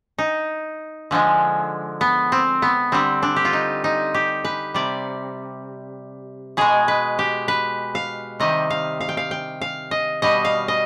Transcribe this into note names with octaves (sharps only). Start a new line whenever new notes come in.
D#4
D3 F3 G#3
B3
C4
B3
D3 G3 C4
D4
G4
F4
D#4
D#4
G4
B4
C3 G3 D5
B2 G#3 G#4
B4
G4
B4
F5
C3 D#3 G3 D#5
F5
F5
G5
F5
G5
F5
D#5
B2 G3 D#5
F5
D#5